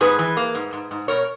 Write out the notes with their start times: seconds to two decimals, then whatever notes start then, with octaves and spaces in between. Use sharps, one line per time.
0.01 G#2 G#4 B4
0.19 E3
0.37 A#3
0.55 G#2
0.73 G#2
0.91 G#2
1.08 B2 A#4 C#5